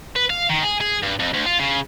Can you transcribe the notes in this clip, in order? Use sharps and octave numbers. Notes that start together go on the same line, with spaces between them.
B4
F5
D#3
G#4
G#4
G2
F2
D2
F4
C#3